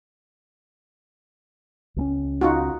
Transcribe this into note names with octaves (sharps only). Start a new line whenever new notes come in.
C#2 A3 C#4
D#4 F4 F#4